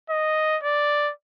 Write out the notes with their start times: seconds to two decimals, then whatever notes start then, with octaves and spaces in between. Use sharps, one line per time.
0.10 D#5
0.63 D5